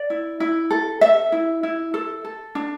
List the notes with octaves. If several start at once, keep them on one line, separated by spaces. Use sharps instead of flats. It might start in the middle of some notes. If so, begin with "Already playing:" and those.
Already playing: D5
E4
E4
A4
A4 E5
E4
E4
A4
A4
D4